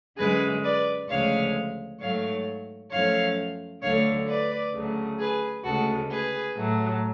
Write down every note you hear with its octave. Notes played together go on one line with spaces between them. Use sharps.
F#2 D3 G#3 G#4 B4
B4 D5
D2 C#3 F3 G#3 C#5 F5
G#2 F#3 A3 C#5 F5
F#2 F3 A3 C#5 F5
D2 D3 F#3 A3 C#5 F5
B4 D5
D2 C#3 F#3 A3
G#4 B4
D2 C#3 G#3 F#4 A4
G#4 B4
A2 F#3 A3